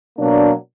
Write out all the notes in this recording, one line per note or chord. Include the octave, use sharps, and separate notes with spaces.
B2 F#3 A#3 D4